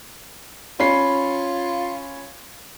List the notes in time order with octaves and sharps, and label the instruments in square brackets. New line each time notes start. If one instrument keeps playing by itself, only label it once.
[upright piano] C#4 B5 C7 [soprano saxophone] F4